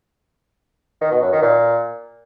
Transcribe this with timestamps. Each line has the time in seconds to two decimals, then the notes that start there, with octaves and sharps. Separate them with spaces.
1.01 D#3
1.11 B2
1.22 F#2
1.32 D#3
1.42 A#2